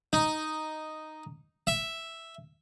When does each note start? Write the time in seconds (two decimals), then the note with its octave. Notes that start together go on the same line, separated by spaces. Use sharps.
0.13 D#4
1.67 E5